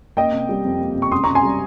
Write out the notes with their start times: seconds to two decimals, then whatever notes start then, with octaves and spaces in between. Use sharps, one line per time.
0.17 A#3 D#5 G5
0.33 C3
0.49 G3
0.65 F2
0.81 A#3
0.96 C3
1.02 C#6
1.11 C#2 C6 D#6
1.24 C3 A#5 C#6
1.35 G#5 C6
1.43 G3